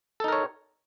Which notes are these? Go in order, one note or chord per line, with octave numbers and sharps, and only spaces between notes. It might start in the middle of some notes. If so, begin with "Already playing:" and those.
D#4 A4 A#4 C#5